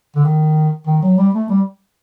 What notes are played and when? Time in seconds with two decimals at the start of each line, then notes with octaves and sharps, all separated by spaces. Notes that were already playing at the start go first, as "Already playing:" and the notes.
0.16 D3
0.25 D#3
0.87 D#3
1.02 F#3
1.18 G3
1.34 A3
1.49 G3